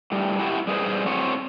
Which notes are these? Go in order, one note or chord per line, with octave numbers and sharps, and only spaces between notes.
A2 G3
E4 F#4 G4
G3 G#4 B4 C5
A2 C4 F#4 C#5